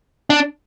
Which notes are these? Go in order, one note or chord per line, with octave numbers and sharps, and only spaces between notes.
D4